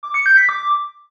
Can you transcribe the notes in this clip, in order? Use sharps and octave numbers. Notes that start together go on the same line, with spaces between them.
D6
C#7
G6
B6
D6